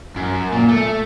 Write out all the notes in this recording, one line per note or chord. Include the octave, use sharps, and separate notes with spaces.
F#2
A#2
A3